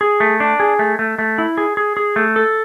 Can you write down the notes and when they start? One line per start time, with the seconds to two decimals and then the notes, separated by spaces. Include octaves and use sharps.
0.01 G#4
0.20 A3
0.40 D4
0.60 G#4
0.79 A3
0.99 A3
1.19 A3
1.38 E4
1.58 G#4
1.77 G#4
1.97 G#4
2.16 A3
2.36 A4